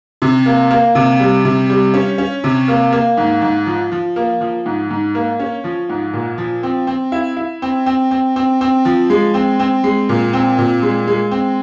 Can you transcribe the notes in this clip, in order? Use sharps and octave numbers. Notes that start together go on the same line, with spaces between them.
C3
A#3
A#3
C3
G3
C3
G3
C#4
C#4
C3
A#3
A#3
G#2
G#2
F3
F3
A#3
F3
G#2
G#2
A#3
C#4
F3
G#2
A#2
F3
C4
C4
E4
E4
C4
C4
C4
C4
C4
F3
G#3
C4
C4
G#3
A#2
C4
A#2
G#3
G#3
C4